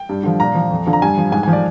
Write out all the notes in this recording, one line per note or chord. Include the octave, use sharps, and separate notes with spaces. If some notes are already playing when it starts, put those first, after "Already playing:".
Already playing: G5
G2
D3 F3
A#2 A#5
F3
F2
D3 F3
A#5
G2 G#5
F3
G#2 G#5
F3 G#5
D5